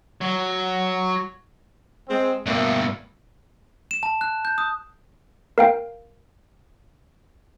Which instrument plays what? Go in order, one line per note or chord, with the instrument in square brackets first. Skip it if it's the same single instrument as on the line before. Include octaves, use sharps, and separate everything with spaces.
[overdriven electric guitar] F#3
[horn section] G#3 C4
[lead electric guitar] G2 B2 [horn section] A#3 E5
[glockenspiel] E7
A5
F#6
G6
D#6
[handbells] A#4 F5 G5